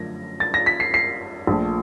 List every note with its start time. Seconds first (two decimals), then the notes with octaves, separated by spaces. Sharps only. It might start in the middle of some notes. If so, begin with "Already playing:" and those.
Already playing: F#2 D3 F3 A3 A#6
0.40 A6
0.54 A#6
0.66 B6
0.80 C7
0.94 C7
1.47 A#1 A#2 F3 A3